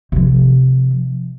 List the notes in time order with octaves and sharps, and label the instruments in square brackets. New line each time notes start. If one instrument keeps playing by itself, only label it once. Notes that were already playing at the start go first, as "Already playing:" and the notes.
[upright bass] C3 F3